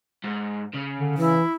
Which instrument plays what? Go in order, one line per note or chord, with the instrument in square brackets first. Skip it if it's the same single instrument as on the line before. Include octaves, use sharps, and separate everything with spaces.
[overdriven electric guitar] G#2
C#3
[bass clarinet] D3
[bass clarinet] E3 [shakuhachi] E4